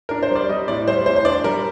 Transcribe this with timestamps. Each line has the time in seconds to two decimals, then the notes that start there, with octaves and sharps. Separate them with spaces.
0.09 D4 A#4
0.23 C5
0.31 G3 D5
0.49 G3 D#5
0.68 A2 D5
0.87 G3 C5
1.06 A2 C5
1.16 C5
1.25 D4 D5
1.44 G3 A#4